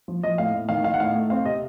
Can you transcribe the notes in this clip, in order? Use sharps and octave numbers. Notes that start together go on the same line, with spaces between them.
F3
F3 D#5
A2 F5
A2
D#3 F5
D#3 F5
F#5
A2 F5
A3
C4 F5
C3 D#5